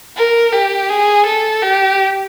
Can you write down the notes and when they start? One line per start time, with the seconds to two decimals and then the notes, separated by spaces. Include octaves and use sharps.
0.17 A#4
0.52 G4
0.89 G#4
1.26 A4
1.62 G4